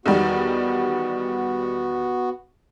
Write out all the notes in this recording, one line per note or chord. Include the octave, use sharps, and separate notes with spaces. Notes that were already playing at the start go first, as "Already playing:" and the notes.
E2 D#3 G3 B3 F#4